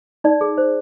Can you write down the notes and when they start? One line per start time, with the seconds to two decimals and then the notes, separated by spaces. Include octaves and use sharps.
0.24 D#4 D5
0.41 G#4
0.58 C5